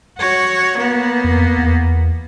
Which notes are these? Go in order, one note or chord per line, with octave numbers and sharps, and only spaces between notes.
F#4 C#5
A#3 B3
F2
E2